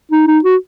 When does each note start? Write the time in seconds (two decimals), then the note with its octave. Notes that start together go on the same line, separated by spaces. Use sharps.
0.12 D#4
0.27 D#4
0.44 F#4